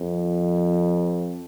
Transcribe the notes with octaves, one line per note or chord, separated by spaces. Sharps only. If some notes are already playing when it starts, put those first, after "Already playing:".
Already playing: F2